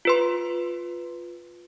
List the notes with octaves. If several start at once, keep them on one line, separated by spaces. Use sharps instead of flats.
F4 B4 C6